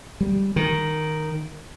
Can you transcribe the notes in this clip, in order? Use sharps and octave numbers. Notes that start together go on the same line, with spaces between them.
G3
D#3